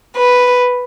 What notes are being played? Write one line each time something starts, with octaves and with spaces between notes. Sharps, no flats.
B4